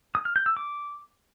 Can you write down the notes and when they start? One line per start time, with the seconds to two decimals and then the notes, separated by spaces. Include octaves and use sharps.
0.15 D#6
0.25 F6
0.36 G6
0.46 E6
0.57 D6